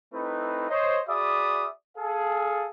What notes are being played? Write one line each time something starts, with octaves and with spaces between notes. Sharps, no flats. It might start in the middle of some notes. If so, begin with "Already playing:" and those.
A3 C4 D#4 E4 B4
C5 C#5 D#5
F#4 G#4 D5 E5 B5 D#6
G#4 A4 F5